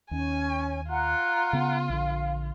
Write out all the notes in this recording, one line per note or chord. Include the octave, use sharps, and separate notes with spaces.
D#2 C#4 G#5
F4 F#5 A#5 F#6
C#3 B3
A#1 D3 F5